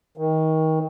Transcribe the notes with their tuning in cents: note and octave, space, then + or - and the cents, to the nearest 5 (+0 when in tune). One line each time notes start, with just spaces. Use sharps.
D#3 +25